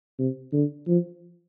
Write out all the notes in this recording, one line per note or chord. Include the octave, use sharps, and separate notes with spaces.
C3
D3
F3